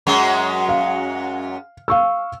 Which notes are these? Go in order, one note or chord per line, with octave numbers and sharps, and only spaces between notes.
F#2 F#3 G#3
F5
F5 C#6 E6